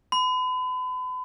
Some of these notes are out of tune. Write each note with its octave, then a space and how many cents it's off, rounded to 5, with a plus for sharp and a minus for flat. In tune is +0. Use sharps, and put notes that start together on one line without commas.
B5 +40